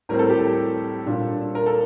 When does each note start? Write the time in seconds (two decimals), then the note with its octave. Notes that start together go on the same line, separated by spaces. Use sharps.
0.09 A2 G3 C4 A#4
0.19 A4
0.29 G4
0.39 A4
1.06 A#2 G3 D4
1.55 A#4
1.66 A4